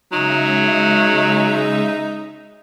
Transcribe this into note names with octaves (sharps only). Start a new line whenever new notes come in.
C#3 F#3 G#3 D#4 E5